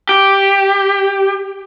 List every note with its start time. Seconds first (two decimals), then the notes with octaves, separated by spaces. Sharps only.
0.09 G4